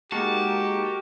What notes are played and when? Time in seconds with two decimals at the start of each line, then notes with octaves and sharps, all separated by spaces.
0.12 G#3 A#3 D#4 F#4 G4 A#4 A5